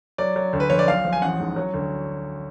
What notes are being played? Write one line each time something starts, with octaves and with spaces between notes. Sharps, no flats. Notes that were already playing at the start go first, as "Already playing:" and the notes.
F#3 D5
F#3
D2
B4
F3 C#5
D5
B1 F5
F3
G#5
A1 F#5
G#2
F#3
D2